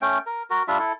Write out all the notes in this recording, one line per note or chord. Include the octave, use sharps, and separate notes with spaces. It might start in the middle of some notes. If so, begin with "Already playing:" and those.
A3 C#4 G5
A#4
F#4 A#4
G3 D4 F4 E5
E4 A4